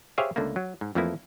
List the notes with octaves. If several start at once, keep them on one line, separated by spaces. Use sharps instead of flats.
G4 G#4 C5 C#5 E5 F5
C#2 D3 A3 A#3
F#3
G#2
F2 E3 F3 A3 A#3 E4